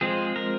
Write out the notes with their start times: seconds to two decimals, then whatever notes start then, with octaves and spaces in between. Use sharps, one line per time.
0.01 F3 G#3 C4 G#4
0.36 A#4